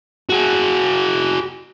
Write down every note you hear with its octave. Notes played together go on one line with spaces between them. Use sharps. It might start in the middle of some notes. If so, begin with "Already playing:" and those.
F#4 G#4